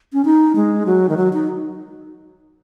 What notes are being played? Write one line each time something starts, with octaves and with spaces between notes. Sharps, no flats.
C#4
D#4
G#3
F#3
D#3
F#3
D#4